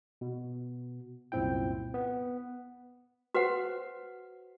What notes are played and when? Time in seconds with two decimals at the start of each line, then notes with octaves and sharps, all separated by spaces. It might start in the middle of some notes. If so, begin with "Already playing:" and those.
0.21 B2
1.32 C2 F#2 A#2 C4 E4 G5
1.94 B3
3.34 F#4 B4 C5 F#5